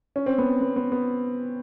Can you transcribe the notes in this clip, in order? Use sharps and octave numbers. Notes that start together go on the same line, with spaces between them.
C#4
C4
B3
B3
B3
B3